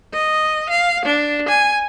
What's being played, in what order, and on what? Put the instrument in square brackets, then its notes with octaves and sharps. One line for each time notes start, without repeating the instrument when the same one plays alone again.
[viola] D#5
F5
D4
G#5